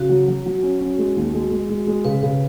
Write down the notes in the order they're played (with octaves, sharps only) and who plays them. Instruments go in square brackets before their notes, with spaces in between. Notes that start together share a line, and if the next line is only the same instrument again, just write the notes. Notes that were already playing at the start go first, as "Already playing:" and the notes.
Already playing: [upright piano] C#3 [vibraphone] F#4
[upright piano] F#3
F#3
F#3
C#4
C#4
G#3
D#2
G#3
G#3
G#3
G#3
[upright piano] C#3 [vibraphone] B4
[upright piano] C#3